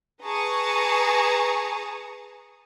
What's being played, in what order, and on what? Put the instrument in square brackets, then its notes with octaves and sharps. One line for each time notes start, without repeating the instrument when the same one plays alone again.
[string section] G#4 B4 A5 A#5 C#6 D#6